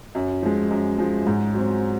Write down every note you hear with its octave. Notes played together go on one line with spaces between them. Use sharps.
F#2
F3 G#3
F#2
F3 G#3
G#2
F#3 C4